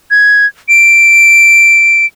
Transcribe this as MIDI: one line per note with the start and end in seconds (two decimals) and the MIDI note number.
0.11 0.46 92
0.69 2.06 98